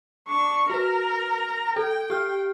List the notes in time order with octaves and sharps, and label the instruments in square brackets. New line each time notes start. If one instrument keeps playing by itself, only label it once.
[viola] D4 C#6
[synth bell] F#4 B4 [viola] A#4 A#5
[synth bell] A4 [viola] G5
[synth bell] G4 F6